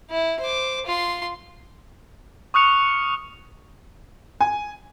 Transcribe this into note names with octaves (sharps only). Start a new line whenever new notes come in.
E4
C5 D6
F4 C6
C#6 D#6 F6 F#6 C#7 F7
G#5